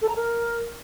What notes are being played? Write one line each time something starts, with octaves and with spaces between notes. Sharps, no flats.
A4
A#5
A#4